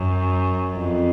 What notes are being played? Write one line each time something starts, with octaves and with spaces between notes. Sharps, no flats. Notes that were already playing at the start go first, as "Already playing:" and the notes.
Already playing: F#2
F2